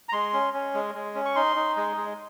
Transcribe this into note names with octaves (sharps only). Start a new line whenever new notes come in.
A#5
G#3 C6
C#4
C#4
G#3
G#3
C#4
C#6
D#4 C6
D#4
G#3
G#3